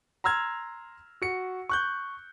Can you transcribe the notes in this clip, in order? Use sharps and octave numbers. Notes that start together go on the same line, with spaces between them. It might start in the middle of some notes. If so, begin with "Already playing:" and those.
A#5 C6 E6 F6 G#6
F#4 C#7
C#6 F#6 G6